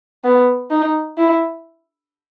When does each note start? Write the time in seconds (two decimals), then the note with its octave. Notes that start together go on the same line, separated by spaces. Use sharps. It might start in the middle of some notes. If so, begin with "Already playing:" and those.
0.24 B3
0.71 D#4
1.18 E4